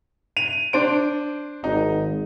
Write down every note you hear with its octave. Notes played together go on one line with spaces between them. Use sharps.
D#7 F7
D4 C5 D7
G#1 D#4